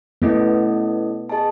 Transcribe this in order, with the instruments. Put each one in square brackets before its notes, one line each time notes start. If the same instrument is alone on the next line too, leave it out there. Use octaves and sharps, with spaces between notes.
[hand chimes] A3 C#4 E4 A4 D#5 [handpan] B3
[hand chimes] G#4 D#5 A5